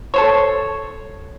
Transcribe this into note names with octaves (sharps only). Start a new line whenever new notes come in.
A4 C5 C#5